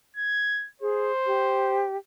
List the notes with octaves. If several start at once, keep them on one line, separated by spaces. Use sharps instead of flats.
G#6
G#4 C5
G4